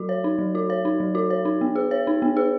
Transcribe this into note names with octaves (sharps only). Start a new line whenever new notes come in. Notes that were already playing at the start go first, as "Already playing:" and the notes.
Already playing: F#3 F#4
C#5
D#4
F#3
F#4
C#5
D#4
F#3
F#4
C#5
D#4
B3
G#4
C#5
D#4
B3
G#4